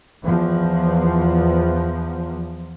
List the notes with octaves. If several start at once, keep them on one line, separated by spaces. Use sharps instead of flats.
E2 F3